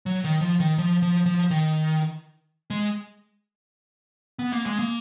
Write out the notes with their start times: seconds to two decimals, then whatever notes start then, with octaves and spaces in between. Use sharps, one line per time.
0.06 F#3
0.24 D#3
0.41 F3
0.60 D#3
0.78 F3
1.02 F3
1.26 F3
1.50 D#3
2.70 G#3
4.39 B3
4.53 A#3
4.66 G#3
4.79 A#3